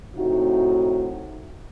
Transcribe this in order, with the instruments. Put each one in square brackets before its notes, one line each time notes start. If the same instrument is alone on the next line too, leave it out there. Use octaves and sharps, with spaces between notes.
[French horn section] A2 C3 D#4 F#4